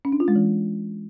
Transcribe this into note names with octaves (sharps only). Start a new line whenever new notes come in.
C#4
D4
F4
G#3
E3